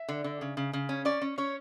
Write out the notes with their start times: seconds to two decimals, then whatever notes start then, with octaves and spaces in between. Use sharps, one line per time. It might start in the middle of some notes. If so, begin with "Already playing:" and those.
Already playing: E5
0.08 D3
0.24 D3
0.41 C#3
0.57 C#3
0.73 C#3
0.89 C#4
1.05 C#4 D5
1.21 C#4
1.38 C#4 C#5